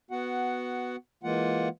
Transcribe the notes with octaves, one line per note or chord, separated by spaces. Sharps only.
B3 F#4 F#5
E3 G#3 A#3 F4 F#5